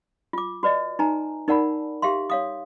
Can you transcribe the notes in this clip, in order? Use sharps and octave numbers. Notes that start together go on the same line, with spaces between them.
F4 D6
F#4 B4 D5 D#5
D#4 B4 G#5 A#5
D#4 A#4 D5 F#5 A5 B5
G4 E5 F5 C6
C#5 F5 D#6